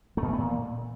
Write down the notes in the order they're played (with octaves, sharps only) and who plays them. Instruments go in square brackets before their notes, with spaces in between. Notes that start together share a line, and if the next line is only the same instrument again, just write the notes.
[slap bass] A3
B2
E3
B3
A#2